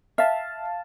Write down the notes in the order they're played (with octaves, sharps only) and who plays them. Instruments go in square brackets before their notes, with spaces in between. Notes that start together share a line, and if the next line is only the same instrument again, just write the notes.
[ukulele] E5 [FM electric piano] F5 A5